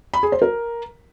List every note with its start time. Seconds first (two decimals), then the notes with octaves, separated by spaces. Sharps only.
0.14 B5
0.23 G#4
0.32 C5
0.42 A#4